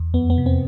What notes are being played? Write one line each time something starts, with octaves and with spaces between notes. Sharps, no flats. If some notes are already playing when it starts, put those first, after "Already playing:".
Already playing: E2
F2 B3
B3
C3
C4